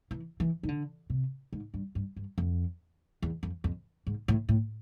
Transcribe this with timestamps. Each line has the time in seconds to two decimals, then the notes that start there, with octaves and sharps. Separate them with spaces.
0.11 E3
0.40 E3
0.63 D#3
0.68 D3
1.10 C3
1.53 G#2
1.74 G2
1.95 G2
2.16 G2
2.38 F2
3.22 E2
3.43 F2
3.64 F2
4.07 G#2
4.28 A2
4.49 A2